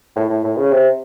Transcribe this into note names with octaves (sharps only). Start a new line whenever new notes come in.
A2
A2
A2
C#3
C3